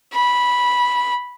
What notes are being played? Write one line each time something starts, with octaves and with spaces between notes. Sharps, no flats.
B5